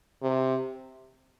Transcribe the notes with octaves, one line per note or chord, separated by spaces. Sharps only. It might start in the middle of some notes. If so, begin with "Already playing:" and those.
C3